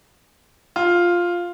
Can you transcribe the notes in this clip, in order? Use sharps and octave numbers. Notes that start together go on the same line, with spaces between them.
F4